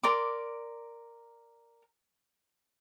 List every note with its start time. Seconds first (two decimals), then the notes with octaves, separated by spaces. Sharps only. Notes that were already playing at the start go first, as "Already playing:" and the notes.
0.03 A#4 D5 C6 D6